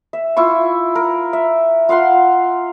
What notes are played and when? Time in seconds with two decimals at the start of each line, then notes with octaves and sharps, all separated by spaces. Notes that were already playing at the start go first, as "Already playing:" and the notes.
0.13 E5
0.37 E4 F4 C#6
0.95 A#4
1.33 E5
1.89 F4 F5 F#5 C6